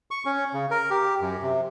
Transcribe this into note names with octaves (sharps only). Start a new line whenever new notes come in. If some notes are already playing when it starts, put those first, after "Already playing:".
C#6
C#4
C#3
A#4
G4
F#2
C3